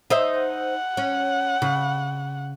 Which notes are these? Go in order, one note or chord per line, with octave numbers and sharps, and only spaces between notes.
D#4 C5 E5
F#5
C#4
C#3